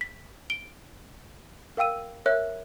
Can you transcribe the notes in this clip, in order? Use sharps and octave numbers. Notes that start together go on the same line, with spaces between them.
B6
D7 G7
A#4 F5 G5 E6 D#7
A#4 C#5 E5 F#6